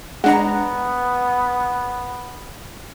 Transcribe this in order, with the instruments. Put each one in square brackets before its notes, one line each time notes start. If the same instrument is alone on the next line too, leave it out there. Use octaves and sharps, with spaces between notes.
[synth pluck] G#3 D4 A#5 [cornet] B3 [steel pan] F#5